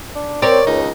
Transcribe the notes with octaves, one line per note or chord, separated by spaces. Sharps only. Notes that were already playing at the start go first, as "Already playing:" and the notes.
D4
C4 A#4 C#5 D5
C#2 D#4